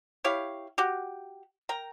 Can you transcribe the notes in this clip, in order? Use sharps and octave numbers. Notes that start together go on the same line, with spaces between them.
E4 G4 C#5 F5
F#4 G4
A#4 G5 A#5